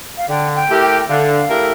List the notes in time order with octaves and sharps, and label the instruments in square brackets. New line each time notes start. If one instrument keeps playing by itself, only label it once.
[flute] F5
[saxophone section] D3 [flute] G5
[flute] G5
[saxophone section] A3 E4 G4 A#4
[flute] G5
[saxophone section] D3 [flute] F5
[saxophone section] A3 E4 G4 A#4